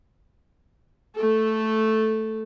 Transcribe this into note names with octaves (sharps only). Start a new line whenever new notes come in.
A3 A4